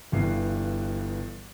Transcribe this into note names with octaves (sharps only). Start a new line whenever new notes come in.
G1 G2 E3 C7